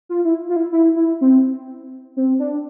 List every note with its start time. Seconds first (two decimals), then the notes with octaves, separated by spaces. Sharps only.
0.09 F4
0.25 E4
0.49 F4
0.56 E4
0.72 E4
0.96 E4
1.21 C4
2.17 C4
2.39 D4